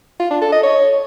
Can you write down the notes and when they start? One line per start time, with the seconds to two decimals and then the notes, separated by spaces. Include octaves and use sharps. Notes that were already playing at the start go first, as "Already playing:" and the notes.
0.20 F4
0.30 D4
0.41 A4
0.52 D#5
0.63 C#5